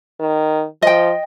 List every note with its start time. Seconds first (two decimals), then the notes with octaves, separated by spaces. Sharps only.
0.20 D#3
0.82 F3 D#5 G5